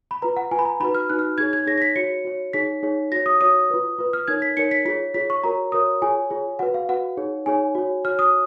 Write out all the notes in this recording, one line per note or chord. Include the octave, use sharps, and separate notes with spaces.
B5
F4 B4 A#5
F#5
F4 B4 G#5
B5
A#5
D#4 F#4 B4 B5
F6
D#4 F#4 B4 F#6
F6
D#4 G#4 C#5 G#6
G#6
D#4 G#4 C#5 A#6
A#6
B6
F#4 C#5 C#7
F#4 C#5
D#4 G#4 C#5 B6
D#4 G#4 C#5
F#4 C#5 A#6
D#6
F#4 C#5 D#6
F4 B4
F4 B4
F6
D#4 A#4 C#5 G#6
B6
D#4 A#4 C#5 C#7
B6
F4 G#4 C#5 B6
F4 G#4 C#5 B6
C#6
F#4 A#4 C#5 A#5
F#4 A#4 C#5 D#6
F4 G#4 C#5 G#5
F4 G#4 C#5
F#4 B4 F#5
F5
F#4 B4 F#5
D#4 G#4 C#5
D#4 G#4 C#5 G#5
F#4 C#5
F#4 C#5 F6
D#6